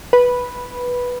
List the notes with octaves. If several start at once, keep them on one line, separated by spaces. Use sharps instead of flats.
B4